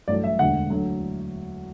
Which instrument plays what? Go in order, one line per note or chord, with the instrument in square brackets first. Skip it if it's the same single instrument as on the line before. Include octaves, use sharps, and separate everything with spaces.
[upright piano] A1 G2 F#3 A3 D5
E5
E1 D2 D3 F#5
D2 D3 F#3 A3